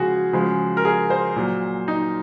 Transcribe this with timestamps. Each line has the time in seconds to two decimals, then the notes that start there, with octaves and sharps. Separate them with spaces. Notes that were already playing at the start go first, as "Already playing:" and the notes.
Already playing: C#3 F3 G#3 F#4 G#4
0.33 C#3 F3 G#3
0.77 A#4
0.85 G#4
1.10 C5
1.36 A#2 F#3
1.88 D#4